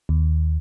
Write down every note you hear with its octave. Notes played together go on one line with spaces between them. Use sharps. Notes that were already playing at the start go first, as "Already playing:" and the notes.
D#2